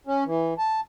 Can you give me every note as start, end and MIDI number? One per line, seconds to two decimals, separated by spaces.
0.07 0.24 61
0.26 0.54 52
0.58 0.80 81